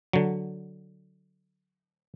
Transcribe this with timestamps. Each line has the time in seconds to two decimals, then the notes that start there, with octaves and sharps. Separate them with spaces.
0.13 D3 F#3